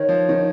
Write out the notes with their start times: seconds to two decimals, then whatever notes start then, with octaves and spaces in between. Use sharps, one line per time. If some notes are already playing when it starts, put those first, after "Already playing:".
Already playing: D#3 C#5
0.09 F3
0.29 D#3